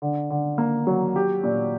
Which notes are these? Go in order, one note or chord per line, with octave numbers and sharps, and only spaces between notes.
D3
D3
A#3
F#3
G4
A#2